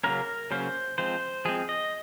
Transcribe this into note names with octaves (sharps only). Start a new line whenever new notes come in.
C#3 F#3 A#3 C#4 A#4
C#3 F#3 A#3 C#4 C5
F3 G#3 C4 C5
F3 G#3 C4 G#4
D#5